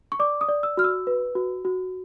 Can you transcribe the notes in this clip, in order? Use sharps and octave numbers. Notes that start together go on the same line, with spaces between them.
C#6
D5 D6
D#6
D5
E6
F#4 F6
E6
B4
F#4
F#4